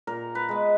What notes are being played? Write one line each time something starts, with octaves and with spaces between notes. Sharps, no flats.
A#2 A#4
B4
G#3 B3